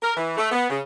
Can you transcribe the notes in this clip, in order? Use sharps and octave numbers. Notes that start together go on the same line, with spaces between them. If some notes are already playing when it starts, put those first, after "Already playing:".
A#4
E3
A3
B3
C#3